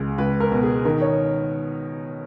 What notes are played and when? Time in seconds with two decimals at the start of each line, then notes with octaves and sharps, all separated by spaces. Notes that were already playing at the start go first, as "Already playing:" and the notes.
Already playing: C#2 G#3
0.18 C#2 B4
0.40 A#4
0.52 B2
0.63 G#4
0.85 D#3 A#4
1.02 C#5